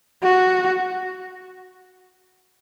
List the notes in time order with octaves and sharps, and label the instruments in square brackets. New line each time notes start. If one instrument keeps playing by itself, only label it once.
[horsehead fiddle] F#4